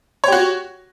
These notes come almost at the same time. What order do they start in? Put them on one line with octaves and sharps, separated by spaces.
C#5 G4 F#4